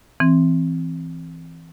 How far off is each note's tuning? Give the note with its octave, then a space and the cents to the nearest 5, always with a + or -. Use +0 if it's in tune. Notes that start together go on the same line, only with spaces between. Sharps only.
E3 +0 C4 +0